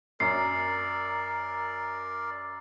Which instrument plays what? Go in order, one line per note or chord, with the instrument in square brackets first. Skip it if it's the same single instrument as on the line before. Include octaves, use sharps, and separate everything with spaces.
[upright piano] F#2 [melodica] A#4 D5 [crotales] C7